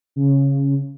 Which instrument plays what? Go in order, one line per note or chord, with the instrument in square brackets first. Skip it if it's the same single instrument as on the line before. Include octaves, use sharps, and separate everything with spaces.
[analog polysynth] C#3